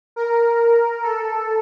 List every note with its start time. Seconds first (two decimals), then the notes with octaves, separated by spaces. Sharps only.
0.16 A#4
1.03 A4